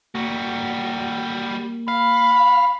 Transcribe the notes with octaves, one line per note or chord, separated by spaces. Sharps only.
G3 A#3 F#4
F5 B5